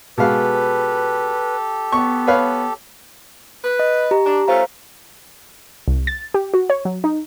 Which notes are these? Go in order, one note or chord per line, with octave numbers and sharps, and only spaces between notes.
B2 G#3 G4 A4 B4 F5
B3 C#6
B4 C#5 F5
B4
D#5
G4 A#5
D4
A3 C#4 F4 C5 F5 A#5
C2
A6
G4
F#4
C#5
F#3
D#4